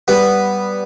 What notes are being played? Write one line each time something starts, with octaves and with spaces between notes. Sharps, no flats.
G3 B3